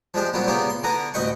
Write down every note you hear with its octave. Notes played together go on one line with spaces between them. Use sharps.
F3 G#3 D4 G4
A#2 F#3 G3 B3 C4
A#2 C#3 E3 A#3 B3 G4
C6
D3 E3 B3 G#5 A#5 D6
A1 D2 B4 D#5 G5 C#6